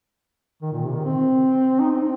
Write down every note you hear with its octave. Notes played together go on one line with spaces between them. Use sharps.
D#3
A#2
C3
D#3
C4
D#4
C4